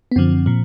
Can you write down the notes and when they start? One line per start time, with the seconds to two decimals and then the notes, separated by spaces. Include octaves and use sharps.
0.12 B3
0.16 F#2 D3 F3 C4
0.46 A#2 F3